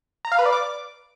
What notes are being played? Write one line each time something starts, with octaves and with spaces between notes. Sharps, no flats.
A#5
F5
B4
D5
D6